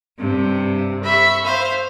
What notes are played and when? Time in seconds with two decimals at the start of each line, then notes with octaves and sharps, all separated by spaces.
0.19 G2 C3
1.03 E5 B5 C#6
1.45 C5 F5